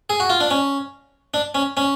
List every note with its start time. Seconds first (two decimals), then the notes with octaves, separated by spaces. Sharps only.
0.10 G#4
0.20 F#4
0.30 F4
0.40 D4
0.51 C#4
1.34 D4
1.55 C#4
1.77 C#4